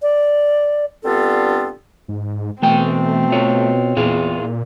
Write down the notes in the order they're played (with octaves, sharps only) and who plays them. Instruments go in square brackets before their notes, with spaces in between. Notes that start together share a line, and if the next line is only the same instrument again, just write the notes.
[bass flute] D5
[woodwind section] G2 D3 B3 C4 F4 A4
[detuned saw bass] G#2
[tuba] B2 [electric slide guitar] E3 G5 [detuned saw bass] A3 [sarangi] C4
[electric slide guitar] F4 C#5
[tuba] E2 [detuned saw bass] A#2 [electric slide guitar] E4 F4 G#4